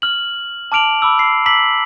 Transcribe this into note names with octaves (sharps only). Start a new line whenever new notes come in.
F6 F#7
A5 D6 F6 D7 F7 F#7
B5 D6 E6
C7
A#5 D6 E6 B6 C7 F#7